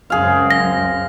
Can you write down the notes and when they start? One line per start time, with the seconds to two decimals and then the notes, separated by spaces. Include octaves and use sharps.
0.10 C#2 F#2 C4 G#4 F5
0.50 A#6